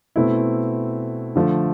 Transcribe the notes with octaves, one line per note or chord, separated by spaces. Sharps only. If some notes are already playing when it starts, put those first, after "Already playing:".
B2 A3 C4 E4
D3 F3 A3